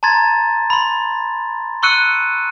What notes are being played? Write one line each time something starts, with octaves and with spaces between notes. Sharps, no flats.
A5 A#5 C6 G#6 A6
B5 C6
C6 C#6 E6 F#6 C#7 D#7